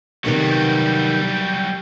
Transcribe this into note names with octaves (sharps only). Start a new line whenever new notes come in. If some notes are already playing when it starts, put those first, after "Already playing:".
C3 D#3 F#3 G3 B3
G6